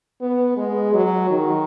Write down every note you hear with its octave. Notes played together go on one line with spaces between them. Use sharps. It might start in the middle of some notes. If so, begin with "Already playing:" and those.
B3
G#3
F#3
D#3